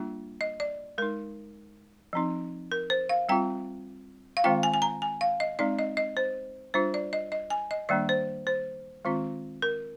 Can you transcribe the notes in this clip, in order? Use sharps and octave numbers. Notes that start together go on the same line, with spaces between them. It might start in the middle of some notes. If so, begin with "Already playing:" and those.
Already playing: G3 A#3 D4 F4
D#5
D5
G#3 D#4 A#4
F3 C4 D#4
A#4
C5
F5
G3 C4 F4 G5
F5
D#3 G#3 C4 F4 G5
G#5
G#5
A#5
G#5
F5
D#5
G#3 C4 D#4 D5
D#5
D#5
C5
G3 D4 F4 C5
D5
D#5
D#5
G#5
D#5
D#3 G3 A#3 D4 D5
C5
C5
D#3 G#3 C4 F4
A#4